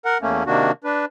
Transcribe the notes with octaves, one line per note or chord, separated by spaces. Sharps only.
A#4 F#5
E2 A3 A#3 C#4
C3 D#3 A#3 D4 F#4
D4 B4